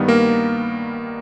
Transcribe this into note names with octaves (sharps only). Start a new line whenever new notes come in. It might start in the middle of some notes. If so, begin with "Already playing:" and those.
Already playing: G2 D#3 G3 B3
A#3 A#4